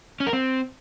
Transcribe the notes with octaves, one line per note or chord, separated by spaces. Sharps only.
C#4
A#4
C4